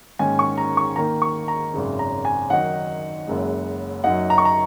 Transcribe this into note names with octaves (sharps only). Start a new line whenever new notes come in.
G#2 D#3 A#3 C#4 G#5
C#6
A#5
C#6
D#2 D#3 A#3 D#4 A#5
C#6
A#5
G#1 F#2 C#3
A#5
G#5
F#2 D#3 F#3 D#4 F#5
F#1 F#2 C#3 G#3
F#2 F#3 D#4 F#5
A#5
C#6
A#5